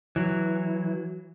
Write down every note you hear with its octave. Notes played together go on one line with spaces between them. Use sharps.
E3 F#3